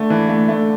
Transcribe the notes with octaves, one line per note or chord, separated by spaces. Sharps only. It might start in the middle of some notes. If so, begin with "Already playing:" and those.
Already playing: D3 A3
E3
A3
A3